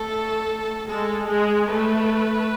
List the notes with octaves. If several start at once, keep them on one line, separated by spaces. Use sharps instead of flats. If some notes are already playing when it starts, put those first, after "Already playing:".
Already playing: A3 A4
G#3 A4
G#3 G#4
A3 B4